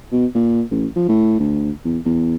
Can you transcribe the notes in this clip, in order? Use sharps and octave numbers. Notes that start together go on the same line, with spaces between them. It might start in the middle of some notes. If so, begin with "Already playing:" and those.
B2
A#2
A1
F3
A2
D2
E2
E2